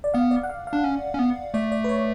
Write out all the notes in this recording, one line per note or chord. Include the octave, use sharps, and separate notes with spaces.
D5
B3 F5
D5
F#5
F5
F5
D4
C#4
C#4
B3
A3 D5
D5
B4
C#5